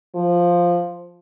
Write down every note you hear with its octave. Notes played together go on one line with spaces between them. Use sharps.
F3